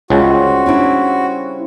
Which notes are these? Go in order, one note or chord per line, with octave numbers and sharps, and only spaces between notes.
C#2 C#3 G3 C4 F#4
C#4 D4 E4